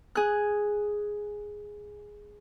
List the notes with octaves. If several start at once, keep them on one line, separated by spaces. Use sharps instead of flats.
G#4 F#6